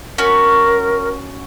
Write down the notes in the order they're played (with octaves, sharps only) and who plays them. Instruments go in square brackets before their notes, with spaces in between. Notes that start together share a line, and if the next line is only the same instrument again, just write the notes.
[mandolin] C#4 F#4 [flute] A#4